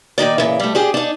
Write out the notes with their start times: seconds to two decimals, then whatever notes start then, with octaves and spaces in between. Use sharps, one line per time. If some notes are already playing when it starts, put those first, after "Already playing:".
0.18 A#2 D#3 D#4 D5
0.38 A#2 C#3 E3
0.60 G3 A3
0.75 D4 G4 G#4
0.94 D4 D#4